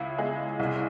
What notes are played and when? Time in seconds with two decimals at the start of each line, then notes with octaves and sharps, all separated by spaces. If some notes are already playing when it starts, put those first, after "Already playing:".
Already playing: C#2 E4
0.18 G#3
0.59 C2